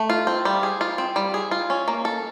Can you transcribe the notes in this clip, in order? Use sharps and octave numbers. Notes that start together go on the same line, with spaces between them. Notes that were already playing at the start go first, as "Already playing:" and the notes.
Already playing: A3
F4
C4
G3
G#4
F4
C4
G3
G#4
F4
C#4
A#3
A4